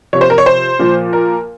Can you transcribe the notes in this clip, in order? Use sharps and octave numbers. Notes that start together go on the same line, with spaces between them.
C3 F3 C#5
C5
A#4
C#5
C5
A#2 F3
A#4